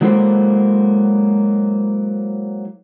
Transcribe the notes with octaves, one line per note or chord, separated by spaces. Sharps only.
F#3 G#3 A#3 E4 A4 C5